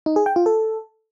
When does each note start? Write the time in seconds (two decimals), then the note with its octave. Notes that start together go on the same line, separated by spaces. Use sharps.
0.06 D#4
0.16 G#4
0.26 G5
0.36 F4
0.46 A4